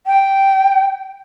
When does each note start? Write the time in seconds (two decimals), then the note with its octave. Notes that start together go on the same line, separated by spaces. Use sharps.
0.07 G5